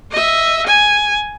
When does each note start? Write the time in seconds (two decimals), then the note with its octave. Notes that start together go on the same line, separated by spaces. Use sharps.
0.11 D#5 E5
0.66 G#5